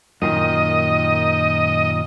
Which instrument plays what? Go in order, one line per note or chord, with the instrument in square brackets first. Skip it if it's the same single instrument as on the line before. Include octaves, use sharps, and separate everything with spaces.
[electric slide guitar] F#2 A#2 D#3 [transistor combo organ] D#5